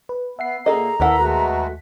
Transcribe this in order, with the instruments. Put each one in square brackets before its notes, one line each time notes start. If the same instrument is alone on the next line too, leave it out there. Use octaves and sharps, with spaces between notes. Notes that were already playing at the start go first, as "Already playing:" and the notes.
[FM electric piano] B4
[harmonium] B3 [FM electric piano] E5 F#5 C7
[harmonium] A#2 [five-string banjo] G#4 A4 D#5 [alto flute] A#5
[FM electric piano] D#2 B6 [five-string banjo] B3 A#4 F#5 [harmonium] E4 A4
[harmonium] G#3 A3 F#4